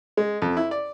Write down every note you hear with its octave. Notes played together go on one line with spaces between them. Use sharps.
G#3
F2
E4
D5